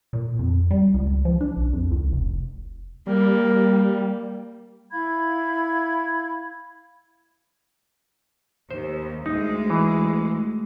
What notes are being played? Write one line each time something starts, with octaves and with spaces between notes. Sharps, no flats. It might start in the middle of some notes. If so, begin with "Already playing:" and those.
A#2
F2
G3
C#2
F3
D4
B1
F2
C#2
F1
G3 A#3
E4 F5 B5 G#6
D#2 C5
D2 G#3 D#4
E3